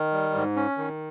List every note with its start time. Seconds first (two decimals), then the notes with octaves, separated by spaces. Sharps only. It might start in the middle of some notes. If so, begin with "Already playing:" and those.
Already playing: D#3
0.12 G3
0.34 G#2
0.56 C#4
0.77 D#3